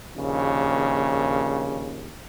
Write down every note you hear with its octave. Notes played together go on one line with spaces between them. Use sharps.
A#1 D#2 C#3